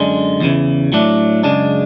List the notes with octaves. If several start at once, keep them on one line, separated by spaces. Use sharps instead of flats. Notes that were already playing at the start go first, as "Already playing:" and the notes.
Already playing: F#2 D3 G#3
E2 C#3 E3
A2 F#3 A3 D4
F#2 C#3 G#3 D4